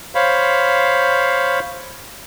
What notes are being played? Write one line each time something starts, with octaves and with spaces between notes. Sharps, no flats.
C5 C#5 F5 B5